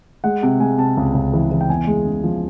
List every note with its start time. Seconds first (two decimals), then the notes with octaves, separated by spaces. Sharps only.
0.24 G#3 F#5
0.43 C3
0.60 G#3 G#5
0.78 C3 A5
0.97 C#2
1.15 C#2
1.33 E3
1.52 E3
1.61 G5
1.70 E2 G#5
1.87 G#3
2.05 C#3
2.24 F3